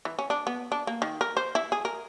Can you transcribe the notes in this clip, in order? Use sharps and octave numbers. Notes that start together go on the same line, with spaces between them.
E3
C#4
D4
B3
D4
A#3
D#3
A#4
C5
E4
G#4
A#4